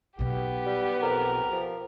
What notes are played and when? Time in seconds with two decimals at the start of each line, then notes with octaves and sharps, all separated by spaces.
0.19 B1 B2 B3 G4
0.66 G3
1.03 F2 A#4
1.52 F3